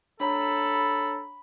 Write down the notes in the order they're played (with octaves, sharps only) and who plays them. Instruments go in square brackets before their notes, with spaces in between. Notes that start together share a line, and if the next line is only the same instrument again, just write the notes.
[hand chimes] D4 C#5 A#5 [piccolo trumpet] A4 [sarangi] B5